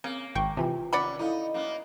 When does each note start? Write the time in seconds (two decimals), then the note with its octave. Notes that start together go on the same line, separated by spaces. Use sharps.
0.04 C#3 A#3 C4
0.35 G#1 G5 C#6
0.57 C3 E3 F4 G5
0.93 D#2 A2 C#4 D5 F#5 B5
1.19 D#4 E4 A4 F5
1.54 F#2 A#3 B3